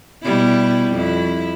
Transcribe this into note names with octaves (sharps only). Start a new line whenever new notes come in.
B2 G3 E4
F2 E4